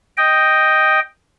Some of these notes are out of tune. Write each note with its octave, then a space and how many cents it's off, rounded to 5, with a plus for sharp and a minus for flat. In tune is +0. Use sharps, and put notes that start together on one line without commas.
D#5 +0 G5 +0